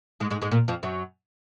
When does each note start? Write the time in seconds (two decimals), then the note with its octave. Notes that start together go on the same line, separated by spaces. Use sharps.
0.20 G#2 G#3
0.30 G#2 G#3
0.42 G#2 G#3
0.52 A#2 A#3
0.68 F2 F3
0.83 F#2 F#3